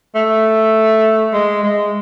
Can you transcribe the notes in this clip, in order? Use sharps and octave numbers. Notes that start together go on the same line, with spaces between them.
A3
G#3
G#3